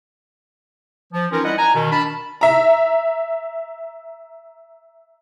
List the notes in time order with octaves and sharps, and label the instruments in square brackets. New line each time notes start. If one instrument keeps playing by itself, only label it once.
[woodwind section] F3
E3 F3 C#4 D#4 F4 A#4
G3 E4 D#5 F#5
G#5 A#5
B2 D#3
D4 A#4 A5 B5
[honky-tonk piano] E5 A#5